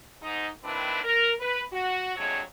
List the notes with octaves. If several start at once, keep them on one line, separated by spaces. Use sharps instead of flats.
G#2 D#4
D#3 A#3 C4 D4 E4 B4
A#4
B4
F#4
F2 C3 F#3 G#3 D4 C#5